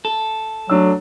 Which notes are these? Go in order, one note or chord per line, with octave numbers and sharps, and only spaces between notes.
A4
F#3 A3 D4 E6